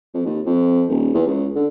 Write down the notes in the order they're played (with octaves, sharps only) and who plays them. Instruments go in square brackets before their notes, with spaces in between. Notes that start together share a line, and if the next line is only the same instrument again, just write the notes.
[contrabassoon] F2
D#2
F2
D#1
E2
C#2
D3